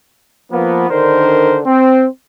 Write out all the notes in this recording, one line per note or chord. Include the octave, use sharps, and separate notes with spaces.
F3 A#3 B3
D3 D#3 D4 A#4 C5
C4